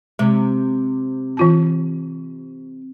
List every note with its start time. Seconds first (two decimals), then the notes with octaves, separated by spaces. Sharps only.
0.19 C3 G#3
1.37 E3 F4 A5